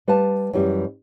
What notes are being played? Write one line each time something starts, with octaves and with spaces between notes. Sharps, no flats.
G3 B4 F5 A5
F#2 E3 G3